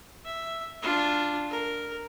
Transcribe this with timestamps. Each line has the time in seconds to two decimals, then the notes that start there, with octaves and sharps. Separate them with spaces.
0.25 E5
0.82 D4 F4
1.50 A#4